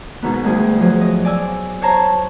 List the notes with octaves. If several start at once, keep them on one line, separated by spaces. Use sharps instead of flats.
G#2 B2 D#3 B3
D2 G3 G#4
F3 F#3 G#4
D#5
D5 G#5 E6
C5 C#5 A5 A#5 C#6